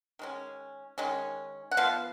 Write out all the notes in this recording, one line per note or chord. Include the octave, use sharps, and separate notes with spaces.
D#3 G#3 C#4
D#3 G#3 C#4
F#5
F3 B3 F5